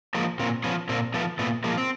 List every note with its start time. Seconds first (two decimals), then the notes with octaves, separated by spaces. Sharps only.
0.15 F3 G#3 A#3
0.39 A#2 A#3 C4
0.64 F3 B3 C#4
0.89 A#2 A#3 C4
1.14 F3 A3 B3
1.39 A#2 A3 B3
1.64 F3 G#3 A#3
1.78 C4